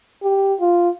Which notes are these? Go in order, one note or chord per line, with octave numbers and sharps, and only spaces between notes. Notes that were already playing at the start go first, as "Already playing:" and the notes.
G4
F4